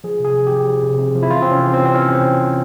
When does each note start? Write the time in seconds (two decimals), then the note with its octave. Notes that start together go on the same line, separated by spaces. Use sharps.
0.04 F3 G#4
0.19 C3
0.24 G#4
0.36 C3
0.47 F3 G4
0.67 F3
0.83 C3
0.99 C3
1.15 F3
1.23 E4
1.30 E3 F4
1.42 C3 C4
1.52 C#4
1.62 C3
1.73 C4
1.78 E3
1.85 C4
1.94 E3 C#4
2.10 C3 C4
2.26 C3
2.42 E3